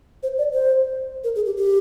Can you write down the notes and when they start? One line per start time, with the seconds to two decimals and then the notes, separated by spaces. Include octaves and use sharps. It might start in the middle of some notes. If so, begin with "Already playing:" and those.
0.23 C5
0.38 D5
0.53 C5
1.24 A#4
1.36 G#4
1.46 G4
1.57 G4